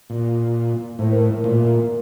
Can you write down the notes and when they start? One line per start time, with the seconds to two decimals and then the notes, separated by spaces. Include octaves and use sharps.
0.10 A#2
0.99 A2 C5
1.11 A#4
1.36 A#4
1.44 A#2